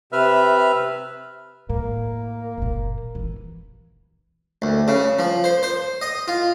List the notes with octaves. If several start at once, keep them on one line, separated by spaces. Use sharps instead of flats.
C3 B4 E5 F6
A2 A#3
F#1 A#2
E3
D2
C#3
F3
C5
C5
D#5
F4